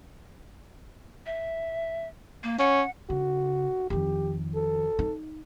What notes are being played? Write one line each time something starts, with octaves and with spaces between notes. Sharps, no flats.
E5
A#3
C#4 F#5
C#3 F#4
F2 D#3 G4
A4
D#4